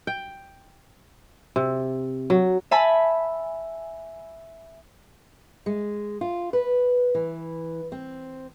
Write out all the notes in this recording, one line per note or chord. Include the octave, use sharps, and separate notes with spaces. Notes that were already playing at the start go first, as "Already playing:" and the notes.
G5
C3
F#3
E5 G#5 A5 B5
G#3
F4
B4
E3
C4